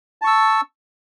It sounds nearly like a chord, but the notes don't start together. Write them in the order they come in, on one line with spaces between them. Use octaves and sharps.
A5 C#6 E6